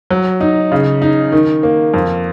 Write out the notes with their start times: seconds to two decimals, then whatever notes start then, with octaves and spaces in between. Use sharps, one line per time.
0.11 F#3
0.40 D#4
0.72 C#3
1.02 D#4
1.32 D#3
1.63 A#3
1.94 F2